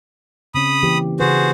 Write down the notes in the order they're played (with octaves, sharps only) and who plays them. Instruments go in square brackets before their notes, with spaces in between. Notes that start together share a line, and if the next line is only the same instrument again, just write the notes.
[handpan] C#3 C4 C#4 [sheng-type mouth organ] B5 D#6
[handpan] E3 A#3 G4
[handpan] C#3 B4 [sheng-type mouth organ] F#4 G#4 C5